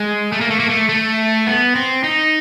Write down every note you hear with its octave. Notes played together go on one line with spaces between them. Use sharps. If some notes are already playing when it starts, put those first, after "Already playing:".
Already playing: G#3
A3
A#3
A3
A#3
A3
A3
B3
C4
D#4